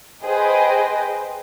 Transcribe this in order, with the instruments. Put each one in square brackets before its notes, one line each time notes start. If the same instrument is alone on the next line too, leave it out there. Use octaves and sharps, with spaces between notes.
[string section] G#4 B4 C5 D#5 G5